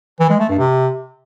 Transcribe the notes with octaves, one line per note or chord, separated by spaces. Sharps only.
E3
G#3
A3
G2
C3